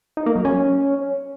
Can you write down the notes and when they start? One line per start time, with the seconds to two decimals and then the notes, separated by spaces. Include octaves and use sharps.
0.17 D#4
0.26 A#3
0.36 F#3
0.45 C#4